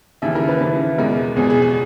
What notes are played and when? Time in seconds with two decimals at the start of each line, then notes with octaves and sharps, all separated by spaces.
0.22 D#2 C#3 E3 E5
0.35 A#4
0.48 B4
0.61 D#2 C#3 E3 B4
0.98 E2 B2 G#3 A#4
1.36 E2 B2 G#3 G#4
1.50 G#4
1.62 G#4